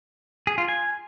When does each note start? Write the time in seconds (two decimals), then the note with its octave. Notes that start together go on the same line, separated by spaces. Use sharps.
0.47 G#4
0.58 F4
0.68 G#5